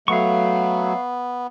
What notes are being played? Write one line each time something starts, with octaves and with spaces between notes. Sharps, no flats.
F#3 A3 B3 F5 C#6